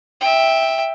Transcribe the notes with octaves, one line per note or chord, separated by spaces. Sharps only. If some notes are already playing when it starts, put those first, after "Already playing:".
E5 G5